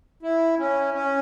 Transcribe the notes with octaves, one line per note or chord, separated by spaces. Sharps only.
E4
C#4
C#4